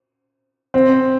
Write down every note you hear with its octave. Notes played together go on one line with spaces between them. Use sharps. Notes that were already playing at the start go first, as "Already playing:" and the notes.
C4